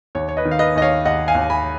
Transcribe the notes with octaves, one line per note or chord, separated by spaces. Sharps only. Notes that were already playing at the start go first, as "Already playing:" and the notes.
D#2 C#5
C#5
B4 D#5
D#3
F5
B4 D#5
D#2 D#5
C#5 F5
D#2 D#5 F#5
F5 G#5
D#2
G#5 B5